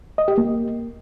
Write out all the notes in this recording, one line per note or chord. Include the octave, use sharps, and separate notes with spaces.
D#5
G4
A#3